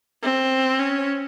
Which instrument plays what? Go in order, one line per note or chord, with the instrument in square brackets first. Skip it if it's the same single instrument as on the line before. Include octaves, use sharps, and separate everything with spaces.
[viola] C4
C#4